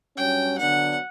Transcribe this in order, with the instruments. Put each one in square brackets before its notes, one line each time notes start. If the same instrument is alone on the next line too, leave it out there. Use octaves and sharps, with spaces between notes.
[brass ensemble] G2 F#3 C#4 [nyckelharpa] G5
[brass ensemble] D3 F#3 B3 D4 [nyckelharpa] F#5